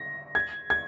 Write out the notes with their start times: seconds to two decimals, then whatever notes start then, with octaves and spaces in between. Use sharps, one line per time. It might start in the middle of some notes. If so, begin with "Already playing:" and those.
Already playing: A#6
0.35 G#6
0.70 G#6